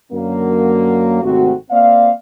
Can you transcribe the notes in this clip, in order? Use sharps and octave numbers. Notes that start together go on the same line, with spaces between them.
F#2 D3 F#3 A#3
G#1 C3 A3 C4 F#4
A#3 C4 D5 E5 F5